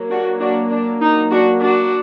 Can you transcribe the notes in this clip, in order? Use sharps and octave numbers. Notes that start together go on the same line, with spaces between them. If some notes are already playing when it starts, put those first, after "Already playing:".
Already playing: F#3 A#3
D4 F#4
D4 F#4
D4
D#4
D4 F#4
D4 F#4